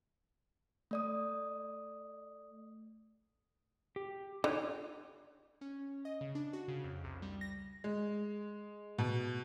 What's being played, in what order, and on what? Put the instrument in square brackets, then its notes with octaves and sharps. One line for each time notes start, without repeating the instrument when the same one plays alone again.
[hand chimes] A3 D5 D#6
[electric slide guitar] G4
[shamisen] D3 [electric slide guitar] D#4 F4 C#5
[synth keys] C#4
D#5
C#3
D4
F#4
C#3
F2
C2
G3
A#6
[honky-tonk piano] G#3
B2